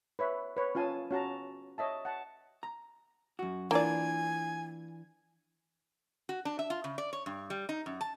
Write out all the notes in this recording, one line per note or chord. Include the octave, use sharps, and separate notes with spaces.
B4 C#5 E5
B4 C#5
C#4 F4 F5 G#5 A5
C#4 F#4 A5 A#5
C#5 D#5 E5 A5
F#5 A5
A#5
F#2 F#4
E3 A#3 D4 F4 D5 G#5
F#4
D4
E5
F4
C#3
D5
C#5
G2
G3
D#4
F#2
A5